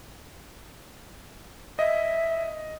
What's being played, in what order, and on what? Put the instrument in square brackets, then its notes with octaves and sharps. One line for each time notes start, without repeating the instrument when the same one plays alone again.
[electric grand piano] D#5 [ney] E5